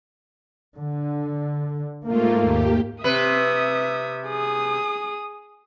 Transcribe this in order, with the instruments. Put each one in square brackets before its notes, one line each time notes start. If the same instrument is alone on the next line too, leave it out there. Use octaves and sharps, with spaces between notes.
[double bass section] D3
[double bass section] G#2 A#3 [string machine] A3 F4
[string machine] D#2 G4
[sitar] C3 B4 [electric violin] E5 D#6
[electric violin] G#4 D#6